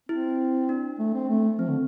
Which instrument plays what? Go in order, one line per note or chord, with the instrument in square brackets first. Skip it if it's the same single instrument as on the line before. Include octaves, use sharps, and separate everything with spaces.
[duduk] C4 [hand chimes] E4
[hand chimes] D4
[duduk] A3
C4
A3
[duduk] F3 [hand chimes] C4
[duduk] D3